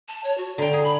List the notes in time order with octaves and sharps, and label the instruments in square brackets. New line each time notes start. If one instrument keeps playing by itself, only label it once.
[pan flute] A5
C#5
F#4
[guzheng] D3 G5 [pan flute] A#5
[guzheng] G#4
[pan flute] B5